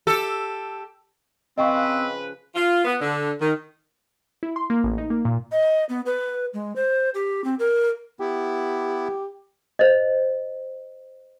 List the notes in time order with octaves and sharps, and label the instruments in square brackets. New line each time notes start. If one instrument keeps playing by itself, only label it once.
[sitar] G4 A4
[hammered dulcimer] C#3 F3 [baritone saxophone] C4 [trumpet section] B4 [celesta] D#5 G5 C#6
[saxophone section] F4
B3
D3
D#3
[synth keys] E4
C6
A#3
A1
D#4
A#3
A#2
[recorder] D#5
B3
B4
G#3
C5
G4
C4
A#4
[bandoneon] B3 E4 [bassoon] G4
[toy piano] C5 D#5